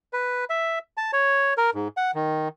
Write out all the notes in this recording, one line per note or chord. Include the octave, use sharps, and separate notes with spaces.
B4
E5
A5
C#5
A#4
G#2
F#5
D#3